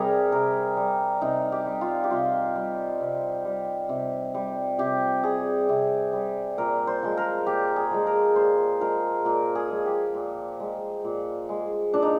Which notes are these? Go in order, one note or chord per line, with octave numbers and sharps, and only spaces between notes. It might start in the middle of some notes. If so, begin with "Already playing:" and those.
Already playing: C3 G3 G#4 A#4
C3 A#4
G3
C3 D#4
G4
G3
F4
G4
C3 F4
G3
C3
G3
C3
G3
C3 G4
G3 G#4
C3
G3
A#2 A#4
C5
F3 G#3
A#4
A#2 G4
G#4
F3 G#3
A#4
A#2 C5
F3 G#3 A#4
A#2 A#4
G#4
F3 G#3
G4
A#2
G#3
A#2
G#3
A#2 D4
D#4